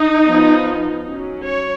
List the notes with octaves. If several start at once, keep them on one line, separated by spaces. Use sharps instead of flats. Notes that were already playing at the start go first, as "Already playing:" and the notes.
Already playing: D#4
F3 B3
F#3 C#4
C#5